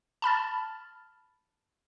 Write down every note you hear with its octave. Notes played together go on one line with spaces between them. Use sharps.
A5 B5 F6 A6